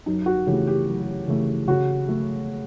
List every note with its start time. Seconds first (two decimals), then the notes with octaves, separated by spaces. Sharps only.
0.06 F#2 D#4
0.26 F#4
0.47 C#3 E3 A3 G4
0.67 G4
0.88 F#2
1.28 C#3 E3 A3
1.68 C#3 F#4
2.08 A3